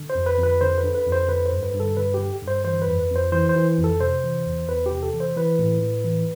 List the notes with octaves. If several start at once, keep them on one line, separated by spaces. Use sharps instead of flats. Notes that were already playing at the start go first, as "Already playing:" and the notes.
Already playing: D3
C5
F2
B4
F2
B4
D3 C5
B4
D3
B4
F2
C5
D3 B4
C5
G2
B4
G2
A4
D3 B4
G4
D3
G2
C5
E3 C5
B4
F2
B4
F2
C5
E3 C5
C5
E3
F2
A4
C3 C5
E3
E2
E2 B4
C3 G4
A4
E3
C5
E3 B4
A2
A2
E3